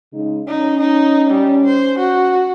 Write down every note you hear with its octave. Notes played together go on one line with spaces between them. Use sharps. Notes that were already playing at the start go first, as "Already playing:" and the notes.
C#3 G#3 D#4
C#4 D#4
D#4
G3
C5
F#4